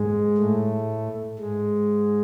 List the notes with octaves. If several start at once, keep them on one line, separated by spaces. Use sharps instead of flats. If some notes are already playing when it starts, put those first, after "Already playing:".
Already playing: G#2 G#3
A2 A3
G#2 G#3